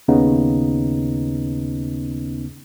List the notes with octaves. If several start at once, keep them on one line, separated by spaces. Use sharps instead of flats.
D#2 C#3 B3 C#4 D#4